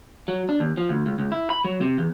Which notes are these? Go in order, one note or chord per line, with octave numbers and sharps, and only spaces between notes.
F#3
D4
D#2
F3
D2
C#2
C#2
E4
B5
F#3
C3
E2